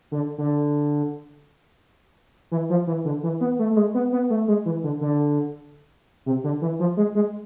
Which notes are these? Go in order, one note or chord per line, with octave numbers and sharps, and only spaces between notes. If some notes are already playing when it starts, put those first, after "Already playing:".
D3
D3
E3
F3
E3
D3
E3
B3
A3
A3
G#3
B3
B3
A3
G#3
E3
D3
D3
C3
D3
E3
F3
G#3
G#3